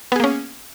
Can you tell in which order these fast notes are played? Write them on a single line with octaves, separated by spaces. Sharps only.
B3 G#4 A#3 C#4